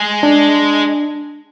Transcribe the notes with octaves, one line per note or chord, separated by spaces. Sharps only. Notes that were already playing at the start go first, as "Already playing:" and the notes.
Already playing: G#3
D4